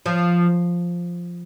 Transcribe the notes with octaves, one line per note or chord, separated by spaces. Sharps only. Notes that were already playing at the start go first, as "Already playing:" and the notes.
F3